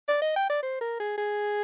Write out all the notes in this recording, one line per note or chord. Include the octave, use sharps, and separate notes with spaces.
D5
D#5
G5
D5
C5
A#4
G#4
G#4